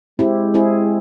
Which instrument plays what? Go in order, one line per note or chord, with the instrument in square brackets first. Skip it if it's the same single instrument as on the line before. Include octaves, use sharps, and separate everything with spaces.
[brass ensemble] G#3 [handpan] C4 E4 G4
[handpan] C4 E4 G#4